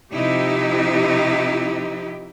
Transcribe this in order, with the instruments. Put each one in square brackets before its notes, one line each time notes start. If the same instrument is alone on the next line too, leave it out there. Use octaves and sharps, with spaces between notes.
[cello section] C3 F3 D#4 E4 G4